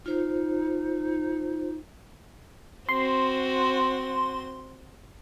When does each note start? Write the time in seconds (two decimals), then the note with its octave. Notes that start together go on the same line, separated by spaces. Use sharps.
0.06 D#4 F4 C5
2.89 C4 F#4 C6